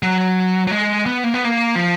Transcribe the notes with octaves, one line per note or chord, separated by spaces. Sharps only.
F#3
F#3
G#3
B3
A#3
B3
A#3
F3